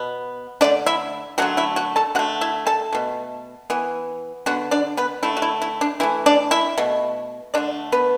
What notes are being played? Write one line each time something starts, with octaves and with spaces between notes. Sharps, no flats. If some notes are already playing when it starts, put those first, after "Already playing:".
Already playing: B2 B3
D3 A3 D4 D5
E4 E5
D3 F#3 A3 F#4 F#5
E4 E5
F#4 F#5
A4 A5
D3 A3 F#4 F#5
E4 E5
A4 A5
B2 A3
E3 B3
D3 B3 F#4 F#5
D4 D5
B3 B4
D3 A3 E4
F#4
E4
E4
D4
E3 A3 E4
D4 D5
E4 E5
B2 A3
D3 A3 D4 D5
B3 B4